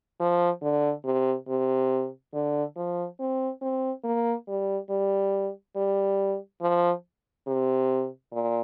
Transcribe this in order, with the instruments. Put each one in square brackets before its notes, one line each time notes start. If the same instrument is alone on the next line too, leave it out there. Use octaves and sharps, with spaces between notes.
[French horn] F3
D3
C3
C3
D3
F3
C4
C4
A#3
G3
G3
G3
F3
C3
A#2